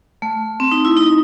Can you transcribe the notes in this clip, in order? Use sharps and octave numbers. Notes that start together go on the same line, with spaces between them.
A3
C4
D#4
E4
D#4